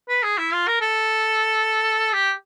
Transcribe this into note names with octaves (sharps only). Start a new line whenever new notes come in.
B4
G#4
E4
F4
A#4
A4
G4